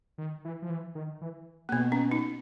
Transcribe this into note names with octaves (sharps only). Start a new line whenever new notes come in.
D#3
E3
F3
E3
D#3
E3
A#3
B2 B3
C#4
D#4